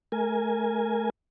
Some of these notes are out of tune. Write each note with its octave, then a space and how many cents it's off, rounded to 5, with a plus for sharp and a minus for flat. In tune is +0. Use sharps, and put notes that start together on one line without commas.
A3 -35 A#4 +0 G#5 +0